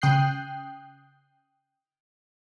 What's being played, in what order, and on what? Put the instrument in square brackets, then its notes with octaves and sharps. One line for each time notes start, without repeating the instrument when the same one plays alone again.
[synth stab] C#3 G5 D#6 F#6 G6 C7